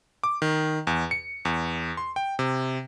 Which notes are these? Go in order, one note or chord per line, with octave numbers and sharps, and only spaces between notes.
D6
D#3
E2
C#7
E2
C6
G5
C3